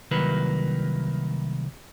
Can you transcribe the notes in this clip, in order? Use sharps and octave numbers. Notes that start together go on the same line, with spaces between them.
C2 D#3 F#3 A#3 B4